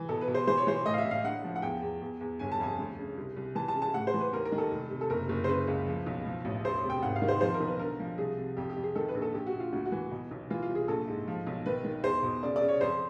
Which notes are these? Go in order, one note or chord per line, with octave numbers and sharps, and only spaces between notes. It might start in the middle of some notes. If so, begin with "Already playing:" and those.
Already playing: E3
B2 A4
B4
B2
C5
E3 C5
C#5
E3 C5
A2 D#5
F5
E5
A1
F5
D3 F#5
F3
F#5
E2 G5
E2
E2
E2
G1 G#5
A5
F2 G#5
D2
C#3
C2
C2
E3 A5
A5
C#3
A5
A2 F#5
C5
E3
B4
D#2 A#4
A#4
D#3
A4
F1
C3
A4
F#1 A#4
F#1
C5
C#3 B4
C#2
F3
B1
F3
A1
E1 C5
C3
G5
G#1 F#5
F5
D#3
C5
F3 C5
A#4
B1
B4
D3 A#4
F3
C2 G#4
C3
F2 G4
G4
F2
G#4
D#3 A4
B4
A#1
A4
A#1 G4
F#4
A#1
F4
D2 F#4
F#4
E3
B2
B1
E3 F4
F4
C2
G#4
A#1 A4
G#2
F3
B1
D#3 B4
D#3
E2 C5
B2
C#3 D5
D5
C#3
C#5
F2 C5